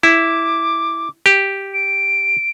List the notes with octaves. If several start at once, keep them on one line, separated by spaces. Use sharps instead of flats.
E4 D6
G4
D7